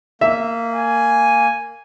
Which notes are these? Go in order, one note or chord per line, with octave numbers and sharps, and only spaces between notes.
A#3 E5
G#5